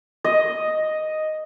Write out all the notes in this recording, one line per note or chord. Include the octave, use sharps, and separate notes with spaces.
D#5